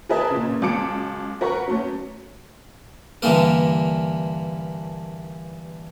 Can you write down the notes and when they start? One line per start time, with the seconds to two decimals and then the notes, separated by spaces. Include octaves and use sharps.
0.09 G#4 A#4 B4 D#5 A5
0.30 A#2 C#3
0.62 C#2 F#3 A5 D6 C#7 D7
1.41 A#4 B4 F#5 A#5 C#6
1.68 F#3 A3 C#4
3.22 G2 D3 E3 A#3 A#4